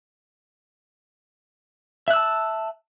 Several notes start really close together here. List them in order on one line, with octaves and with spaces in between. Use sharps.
E5 F#6 E6 A5